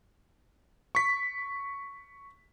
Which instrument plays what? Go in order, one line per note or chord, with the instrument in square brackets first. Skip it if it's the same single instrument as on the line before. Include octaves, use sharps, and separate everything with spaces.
[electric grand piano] C#6 B6